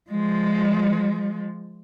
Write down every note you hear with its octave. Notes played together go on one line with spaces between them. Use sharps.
F3 G#3